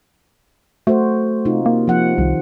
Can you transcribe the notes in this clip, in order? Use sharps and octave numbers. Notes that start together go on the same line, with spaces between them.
A3 F#4 C5
C3 D#4 F4
A#3
F3 F#5
C2 D#3